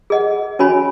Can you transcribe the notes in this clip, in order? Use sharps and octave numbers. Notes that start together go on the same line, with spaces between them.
G#4 D#5 F#5
C#4 F#4 C#5 G#5 B5